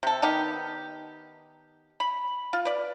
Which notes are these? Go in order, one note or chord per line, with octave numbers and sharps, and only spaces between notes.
C3 A4
D#3 B3 D#4 G4
B5
F4
B4 D5